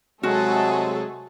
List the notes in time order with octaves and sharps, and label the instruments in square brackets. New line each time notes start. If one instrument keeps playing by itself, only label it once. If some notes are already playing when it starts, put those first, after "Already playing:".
[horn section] C3 G#3 [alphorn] F#3 [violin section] A3 G#4 A4 [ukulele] F#4